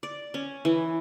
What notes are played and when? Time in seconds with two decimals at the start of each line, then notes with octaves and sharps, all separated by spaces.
0.03 D5
0.34 C#4
0.65 E3